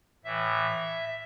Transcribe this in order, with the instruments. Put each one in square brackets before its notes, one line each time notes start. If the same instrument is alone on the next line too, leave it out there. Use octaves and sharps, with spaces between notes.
[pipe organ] A2 E3 E5